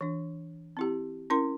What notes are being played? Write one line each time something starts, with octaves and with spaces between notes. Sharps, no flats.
E3 D4
C4 E4 G4
C#4 E4 A#4 C6